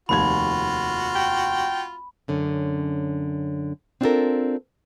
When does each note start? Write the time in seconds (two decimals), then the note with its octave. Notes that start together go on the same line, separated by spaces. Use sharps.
0.09 F1 D#2 F4 F#4 B5 G#6
1.15 G5
2.28 F#2 D3 C#4
4.01 C4 D4 F4 F#4 A4 A#4